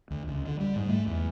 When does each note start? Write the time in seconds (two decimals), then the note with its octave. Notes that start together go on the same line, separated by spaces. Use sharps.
0.10 D2
0.28 C#2
0.45 D3
0.60 G3
0.76 G#2
0.89 A3
1.07 E2